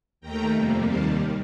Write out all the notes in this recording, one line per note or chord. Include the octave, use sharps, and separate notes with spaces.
D#2 D#3 A3 G5 A#5
F2 C3 G3 A#3
D#2 D#3 G3 F5 A5